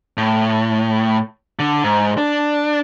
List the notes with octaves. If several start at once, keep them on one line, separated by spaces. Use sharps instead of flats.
A2
D3
G#2
D4